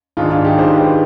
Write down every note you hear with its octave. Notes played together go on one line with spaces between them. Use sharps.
G#2 D#3 G#3 D4 F4
D4 F4
D#4 G4
G#4 C5
G4 B4